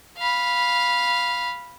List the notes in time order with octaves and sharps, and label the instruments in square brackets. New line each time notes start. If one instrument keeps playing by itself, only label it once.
[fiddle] F5 B5